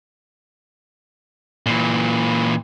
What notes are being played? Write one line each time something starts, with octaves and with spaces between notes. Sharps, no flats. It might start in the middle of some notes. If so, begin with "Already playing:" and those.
A#2 E3